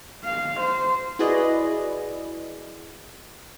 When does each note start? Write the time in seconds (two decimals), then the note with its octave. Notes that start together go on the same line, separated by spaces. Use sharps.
0.24 F5
0.60 C5
1.19 E4 F#4 G#4 B4 D5 D#5